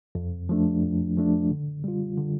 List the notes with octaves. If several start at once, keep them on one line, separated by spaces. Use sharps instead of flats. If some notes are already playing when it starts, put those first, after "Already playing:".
F2
F3 A3 D4
F2
F3 A3 D4
D3
G3 F4
D3